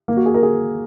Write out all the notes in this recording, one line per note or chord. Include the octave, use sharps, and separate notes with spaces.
A#3
F#4
G#4
A#4
G#4